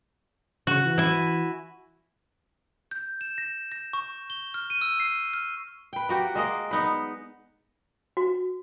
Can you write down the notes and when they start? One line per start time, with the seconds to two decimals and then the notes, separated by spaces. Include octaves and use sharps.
0.67 C#3 F#4
0.85 E3
0.98 E4 G#5
2.91 G6
3.21 E7
3.38 A#6
3.72 A#6
3.93 C#6
4.30 G7
4.54 F6
4.70 D#7
4.81 E6
5.00 C7
5.34 F6
5.93 B4 G5
6.09 A#3 F#4 G4
6.35 G#3 A#3 D#5
6.71 B3 D#4 B4
8.17 F#4